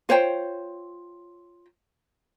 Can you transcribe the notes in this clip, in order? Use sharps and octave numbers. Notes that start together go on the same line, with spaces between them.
F4 C5 C#5 G5